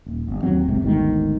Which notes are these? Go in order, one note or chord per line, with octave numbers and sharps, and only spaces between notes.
D#1
G1
D1 D#2 F#3 C4
F#1 B1 G#2 C3
G1 D2 G#2 D#3